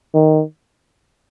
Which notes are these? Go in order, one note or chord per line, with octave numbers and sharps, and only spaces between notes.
D#3